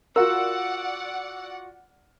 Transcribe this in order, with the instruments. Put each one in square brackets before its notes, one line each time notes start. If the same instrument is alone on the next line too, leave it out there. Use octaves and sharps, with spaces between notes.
[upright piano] F4 F#4 [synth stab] A#4 [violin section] D5 F#5 [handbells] E6